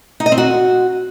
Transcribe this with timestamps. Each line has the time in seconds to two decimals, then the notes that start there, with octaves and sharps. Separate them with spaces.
0.20 D#4
0.26 D#5
0.32 C4
0.38 F#4